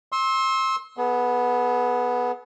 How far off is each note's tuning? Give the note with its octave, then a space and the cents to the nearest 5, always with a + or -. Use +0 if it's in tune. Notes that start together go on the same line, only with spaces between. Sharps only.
C6 +30 E6 -25
B3 -5 G#4 +40